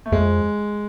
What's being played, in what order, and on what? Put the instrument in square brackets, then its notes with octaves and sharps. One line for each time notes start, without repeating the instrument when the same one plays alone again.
[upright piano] A3
[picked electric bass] F2 [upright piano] G#3